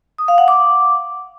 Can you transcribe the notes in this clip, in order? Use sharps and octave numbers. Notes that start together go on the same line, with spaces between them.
D#6
F5
F#5
D6